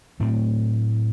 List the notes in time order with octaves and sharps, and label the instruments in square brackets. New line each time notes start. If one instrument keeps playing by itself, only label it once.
[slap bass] A2 F#3 A3 C4